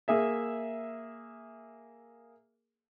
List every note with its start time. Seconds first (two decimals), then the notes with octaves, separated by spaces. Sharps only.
0.08 A#3 G#4 E5